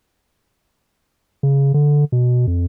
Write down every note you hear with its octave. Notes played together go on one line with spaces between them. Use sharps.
C#3
D3
B2
F2